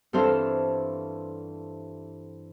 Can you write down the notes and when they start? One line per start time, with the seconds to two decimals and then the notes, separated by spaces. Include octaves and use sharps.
0.13 G2 E3 C4 A4 C5 F5